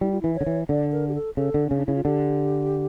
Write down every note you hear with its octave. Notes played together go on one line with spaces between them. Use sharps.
G3 E4
F4
E3 E4
C#5
D3
E3
D3 D5
A#4
G4
A4
C#3 A4
D3
C#3 C#4
D4
C#3 E4
F4
D3 G4